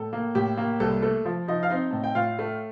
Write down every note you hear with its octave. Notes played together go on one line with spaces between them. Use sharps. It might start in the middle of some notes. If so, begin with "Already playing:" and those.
Already playing: A2 A4
A#3
A2 G4
A#3
C2 A4
A3 A4
F3
F3 D#4 D#5
F5
C4 D#4 D#5
A2 A5
G5
A2 F4 F5
A3